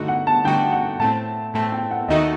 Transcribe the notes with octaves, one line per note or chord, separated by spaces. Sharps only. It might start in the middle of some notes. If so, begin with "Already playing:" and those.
Already playing: G2 D3 A3 D#4 F#4
F#5
A5
G2 D3 A3 D#4 F#4 G5
F#5
A2 A3 C4 A5
A2 A3 C4 A5
G5
F#5
D#2 D#3 A3 D#4 F#4 D#5